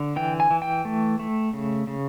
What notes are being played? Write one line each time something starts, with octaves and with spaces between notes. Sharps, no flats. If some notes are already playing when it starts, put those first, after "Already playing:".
Already playing: D3
E3 G5
G#5
E3
G5
A3
A3
C#3
C#3